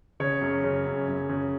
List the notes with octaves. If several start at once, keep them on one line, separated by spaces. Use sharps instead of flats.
C#3 C#5
F#2
C#3
F#2
F#2
C#3